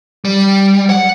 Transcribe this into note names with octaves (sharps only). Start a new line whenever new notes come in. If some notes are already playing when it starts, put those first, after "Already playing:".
G3
F#5